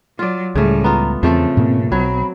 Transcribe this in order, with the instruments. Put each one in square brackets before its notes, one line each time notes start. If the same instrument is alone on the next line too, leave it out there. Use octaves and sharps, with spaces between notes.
[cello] F#3 [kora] F4 D5
[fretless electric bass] C#2 [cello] A2 G3 [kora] C#3 A3
[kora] B3 F4 [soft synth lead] A#5
[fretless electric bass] E2 [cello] C#3 [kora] F3 A3 A4 [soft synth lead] C4
[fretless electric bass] G#2 B2 A#3
[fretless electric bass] B1 [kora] F#3 [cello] C4 [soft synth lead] B5